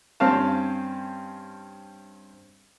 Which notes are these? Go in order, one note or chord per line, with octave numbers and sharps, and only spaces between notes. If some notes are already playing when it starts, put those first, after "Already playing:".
G2 C4 C#4 F5 A5